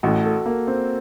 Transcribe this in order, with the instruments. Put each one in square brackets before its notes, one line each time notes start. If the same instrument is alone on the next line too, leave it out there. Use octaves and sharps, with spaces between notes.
[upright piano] A1 A2 A3 [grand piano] F#4
[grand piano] A4
A#3
C4